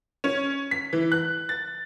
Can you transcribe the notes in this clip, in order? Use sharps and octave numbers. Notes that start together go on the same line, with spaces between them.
C#4
B6
E3
F#6
A6